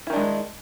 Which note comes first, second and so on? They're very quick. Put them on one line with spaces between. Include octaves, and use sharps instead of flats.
E4 D#3 D4 G#3